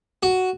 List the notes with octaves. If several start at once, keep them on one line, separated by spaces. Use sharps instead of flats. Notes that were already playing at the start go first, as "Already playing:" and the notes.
F#4